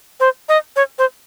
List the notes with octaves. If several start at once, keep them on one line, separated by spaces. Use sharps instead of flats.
C5
D#5
C#5
C5